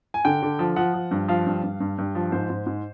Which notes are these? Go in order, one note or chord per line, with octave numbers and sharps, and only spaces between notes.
G#5
D3 G5
D3
F3
F3 F#5
F3
G2
F3 F5
G2
G2
G2
G2
F3
G#2 C5
G#2
G#2